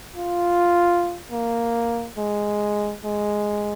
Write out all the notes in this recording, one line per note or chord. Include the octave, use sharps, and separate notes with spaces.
F4
A#3
G#3
G#3